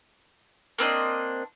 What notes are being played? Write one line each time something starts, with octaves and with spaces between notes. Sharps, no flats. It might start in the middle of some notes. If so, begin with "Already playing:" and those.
A#3 C4 D4 D#5